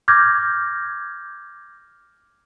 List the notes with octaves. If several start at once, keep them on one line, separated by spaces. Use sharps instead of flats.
D6 F6 G6 G#6 A#6